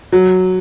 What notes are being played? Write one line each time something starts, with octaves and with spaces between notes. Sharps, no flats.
F#3